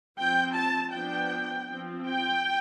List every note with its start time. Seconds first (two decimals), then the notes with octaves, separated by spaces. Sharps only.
0.18 F3 C4 G5
0.56 A5
0.94 F3 B3 D4 G5
1.69 F3 C4
2.07 G5